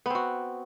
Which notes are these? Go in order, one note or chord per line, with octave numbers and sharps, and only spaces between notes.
B3 C4 F#4